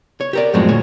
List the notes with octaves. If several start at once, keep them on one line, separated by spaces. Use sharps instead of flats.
C#5
G4 A#4 D5
F#2 A2 F3 F#3 G#3 C4
D2 A#2 C#5